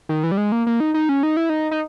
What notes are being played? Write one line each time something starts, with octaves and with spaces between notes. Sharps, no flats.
D#3
E3
G3
G#3
A#3
A#3
D#4
D#4
C#4
D#4
E4
D#4
D#4